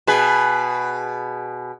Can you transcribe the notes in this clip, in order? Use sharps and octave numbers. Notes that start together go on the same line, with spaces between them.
B2 G#4 B4